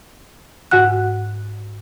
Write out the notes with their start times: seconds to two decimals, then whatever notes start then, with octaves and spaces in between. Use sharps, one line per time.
0.71 G#2 F#4 F#5 F#6